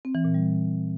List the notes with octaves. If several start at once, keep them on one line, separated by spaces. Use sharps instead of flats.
C4
E3
A#2
G3